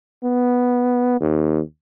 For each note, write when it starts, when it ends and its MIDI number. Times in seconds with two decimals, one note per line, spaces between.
0.24 1.17 59
1.20 1.60 39